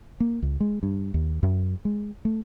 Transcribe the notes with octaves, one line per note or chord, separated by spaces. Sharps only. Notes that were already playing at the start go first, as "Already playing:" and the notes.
A#3
C#2
G#3
G2
D#2
F#2
G#3
A3